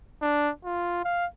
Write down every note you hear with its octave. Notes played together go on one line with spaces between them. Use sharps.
D4
F4
F5